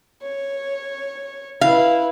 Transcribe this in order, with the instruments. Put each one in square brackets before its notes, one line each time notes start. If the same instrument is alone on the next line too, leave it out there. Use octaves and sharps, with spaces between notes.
[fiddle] C#5
[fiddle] E4 B4 [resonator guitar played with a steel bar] F5